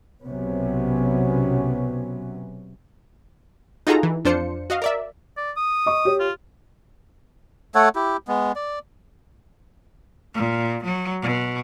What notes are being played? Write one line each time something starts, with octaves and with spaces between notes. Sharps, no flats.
B1 C3 F#3 B3 C#4
D#4 F4 F#4 G#4 A4 A#5
E3
F2 D4 F4 C5 C#7
F#4 D#5 F5
A#4 D5 E5
D5
D#6
D#5 C#6
G4 C#5
F4
A3 A4 C#5 F#5
E4 G4
G#3 B3
D5
A#2
F#3
B2